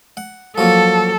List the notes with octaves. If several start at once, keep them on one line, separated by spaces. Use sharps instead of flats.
F#5
F3 F#3 A#3 A4